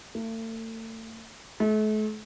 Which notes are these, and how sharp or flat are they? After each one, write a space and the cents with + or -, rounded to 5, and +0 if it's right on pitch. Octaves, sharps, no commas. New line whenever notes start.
A3 +40
A3 -40